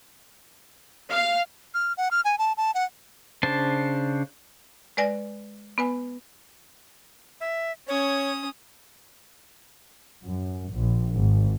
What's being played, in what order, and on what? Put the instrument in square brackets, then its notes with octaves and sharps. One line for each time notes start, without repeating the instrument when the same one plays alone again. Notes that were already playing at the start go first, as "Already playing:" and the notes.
[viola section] F5
[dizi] F6
F#5
F6
G#5
A5
A5
F#5
[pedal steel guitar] C#3 D4 C5 A5
[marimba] G#3 B4 D5 G#5 A#6
B3 B4 G#5
[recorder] E5
[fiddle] C#4 D#6 [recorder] C#5
[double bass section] F#2
A#1
G#1